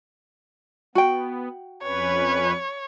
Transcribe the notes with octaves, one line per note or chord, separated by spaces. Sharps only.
B3 F#4 G5
F2 C#4 B4 C#5